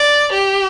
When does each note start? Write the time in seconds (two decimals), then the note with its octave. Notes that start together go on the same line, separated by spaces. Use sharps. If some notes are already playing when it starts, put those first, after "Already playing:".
Already playing: D5
0.32 G4